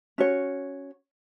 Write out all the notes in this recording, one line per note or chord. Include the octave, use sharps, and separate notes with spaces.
C#4 F#4 C#5